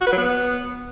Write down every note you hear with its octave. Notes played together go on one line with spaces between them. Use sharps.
F#4
B4
F#3
B3